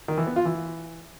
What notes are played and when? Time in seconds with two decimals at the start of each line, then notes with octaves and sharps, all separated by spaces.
0.08 D#3
0.18 E3
0.27 B3
0.36 F4
0.45 E3